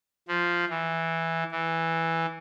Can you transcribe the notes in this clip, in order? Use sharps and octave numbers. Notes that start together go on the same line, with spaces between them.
F3
E3
E3